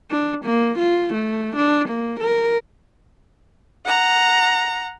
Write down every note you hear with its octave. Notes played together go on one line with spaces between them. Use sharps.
D4
A#3
F4
A3
D4
A#3
A#4
F#5 A#5